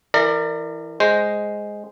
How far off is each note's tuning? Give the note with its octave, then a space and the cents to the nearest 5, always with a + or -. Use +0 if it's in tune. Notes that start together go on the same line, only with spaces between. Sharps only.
E3 +0 A#4 -20 D5 +25
G#3 +0 C5 +0